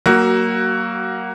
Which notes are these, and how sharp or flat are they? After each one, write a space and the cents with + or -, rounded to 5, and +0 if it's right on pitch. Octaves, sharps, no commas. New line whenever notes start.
F#3 +30 A#3 +0 F#4 +15